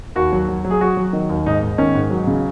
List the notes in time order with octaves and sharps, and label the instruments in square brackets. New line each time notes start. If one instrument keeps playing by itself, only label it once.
[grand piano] D#2 F#4
F#3
F#3
F#3
G#4
F#3 F#4
F#3
D#3
D#2
G#2 D#4
G#2
D#3 C#4
G#2
F#3
C#3